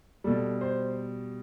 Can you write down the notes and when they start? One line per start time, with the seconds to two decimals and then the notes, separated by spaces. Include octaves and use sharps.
0.24 B2 G3 A4
0.61 C5